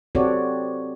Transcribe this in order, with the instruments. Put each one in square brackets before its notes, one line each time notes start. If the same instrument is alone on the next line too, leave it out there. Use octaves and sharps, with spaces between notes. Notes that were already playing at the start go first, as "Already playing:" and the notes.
[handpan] C4 F#4 G4 A4 C#5 D5